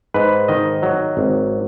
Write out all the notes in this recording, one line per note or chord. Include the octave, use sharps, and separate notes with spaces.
G#2 B4
D#3 D#5
F#3
G#1